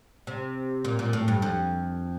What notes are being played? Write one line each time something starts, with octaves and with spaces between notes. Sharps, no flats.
C3
A#2
A#2
A2
G2
F2